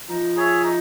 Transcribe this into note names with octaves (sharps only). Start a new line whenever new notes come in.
F3 D#4
G#4 C#5 E5
D#4